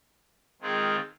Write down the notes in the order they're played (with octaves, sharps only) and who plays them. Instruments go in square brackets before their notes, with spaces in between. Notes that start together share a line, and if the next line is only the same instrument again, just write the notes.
[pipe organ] D#3 G#3 C4 F4 G#4